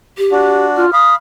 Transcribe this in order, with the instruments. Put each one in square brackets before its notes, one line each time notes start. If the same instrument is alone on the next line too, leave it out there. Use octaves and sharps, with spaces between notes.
[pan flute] G4
[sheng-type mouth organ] D4 F#4
[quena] F4 [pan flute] F6
[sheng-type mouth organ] F5 B5 [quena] D#6